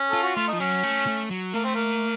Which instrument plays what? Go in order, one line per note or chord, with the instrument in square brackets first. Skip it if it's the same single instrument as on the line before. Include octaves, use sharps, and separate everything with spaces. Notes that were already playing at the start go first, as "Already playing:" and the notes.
Already playing: [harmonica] C#4
[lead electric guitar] F4 [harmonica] A4
[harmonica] F#4
[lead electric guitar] A3 [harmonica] F4
[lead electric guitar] F3 [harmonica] D#4
[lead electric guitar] F#3 [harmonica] C#4
[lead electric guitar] A3
A3
F#3
[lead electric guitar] A3 [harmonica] A#3
[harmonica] C4
A#3